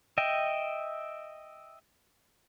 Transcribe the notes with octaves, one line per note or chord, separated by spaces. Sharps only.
D#5 E5 G5